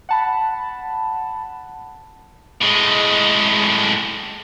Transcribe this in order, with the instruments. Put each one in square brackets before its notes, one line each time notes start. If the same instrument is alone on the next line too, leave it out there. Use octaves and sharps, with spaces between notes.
[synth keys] F#5 A5 B5
[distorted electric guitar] A2 G#3